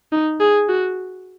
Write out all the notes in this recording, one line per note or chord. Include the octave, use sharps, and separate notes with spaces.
D#4
G#4
F#4